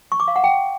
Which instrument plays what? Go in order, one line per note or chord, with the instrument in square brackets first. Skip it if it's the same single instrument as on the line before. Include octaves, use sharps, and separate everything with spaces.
[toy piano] C#6
D6
F5
F#5
G5